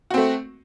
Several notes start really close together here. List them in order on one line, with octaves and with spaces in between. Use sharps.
F#4 C4 A3